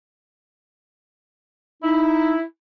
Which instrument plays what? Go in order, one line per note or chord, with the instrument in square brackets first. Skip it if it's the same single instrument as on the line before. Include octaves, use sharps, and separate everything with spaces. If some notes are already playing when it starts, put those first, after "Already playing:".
[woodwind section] D#4 [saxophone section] E4